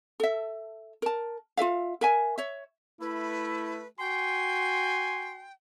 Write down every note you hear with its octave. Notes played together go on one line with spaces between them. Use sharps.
A4 E5
A#4 A5
F4 A#4 E5 F5
A#4 E5 G#5
C#5 E5
A3 E4 B4
F#4 G5 G#5 C6